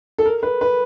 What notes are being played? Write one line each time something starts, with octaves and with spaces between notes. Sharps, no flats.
A4
A#4
B4
B4